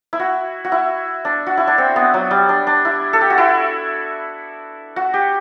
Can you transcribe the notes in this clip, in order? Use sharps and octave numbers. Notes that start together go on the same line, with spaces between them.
E4
F#4
F#4
E4
D4
F#4
E4
D4
C4
B3
F#3
G3
D4
D4
E4
A4
G4
F#4
E4
F#4
G4